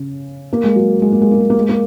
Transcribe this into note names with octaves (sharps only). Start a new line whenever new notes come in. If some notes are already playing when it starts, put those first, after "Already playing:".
Already playing: C#3
A#3
G#3
F#3
G#3
A#3
G#3
A#3
G#3
A#3
G#3
A#3